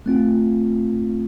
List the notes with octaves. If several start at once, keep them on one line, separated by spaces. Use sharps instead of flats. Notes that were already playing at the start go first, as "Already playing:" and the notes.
A3 C4 F4